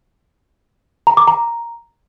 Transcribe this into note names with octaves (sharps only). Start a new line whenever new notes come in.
A#5
D6
A#5